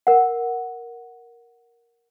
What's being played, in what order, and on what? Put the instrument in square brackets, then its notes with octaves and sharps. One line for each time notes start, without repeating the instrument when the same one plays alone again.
[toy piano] A#4 F#5